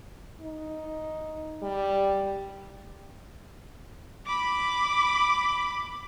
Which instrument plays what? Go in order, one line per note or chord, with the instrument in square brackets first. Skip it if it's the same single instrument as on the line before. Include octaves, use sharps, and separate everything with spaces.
[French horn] D#4
G3
[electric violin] B5 D6